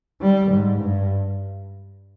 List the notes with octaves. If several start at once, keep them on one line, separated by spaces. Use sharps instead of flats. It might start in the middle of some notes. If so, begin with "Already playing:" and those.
G3
G#2
G2